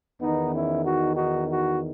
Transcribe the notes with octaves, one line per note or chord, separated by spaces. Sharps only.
E2 D#3 B3 D#4
C#4 E4
D#4 F#4
D#4 F#4
D#4 F#4